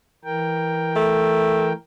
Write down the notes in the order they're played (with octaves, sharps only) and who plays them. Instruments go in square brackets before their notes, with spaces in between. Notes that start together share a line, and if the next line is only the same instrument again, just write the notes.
[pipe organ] E3 A#4 G5
[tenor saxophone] A3